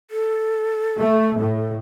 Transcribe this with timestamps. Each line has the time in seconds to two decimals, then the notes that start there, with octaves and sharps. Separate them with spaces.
0.11 A4
0.99 A3
1.40 A2